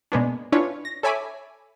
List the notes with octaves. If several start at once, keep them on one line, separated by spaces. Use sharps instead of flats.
B2 G#3 A#3 B3 C#4 D4
C#4 D4 E4 F4 B4 C#5
A#6
A4 C#5 E5 G#5 B5 D6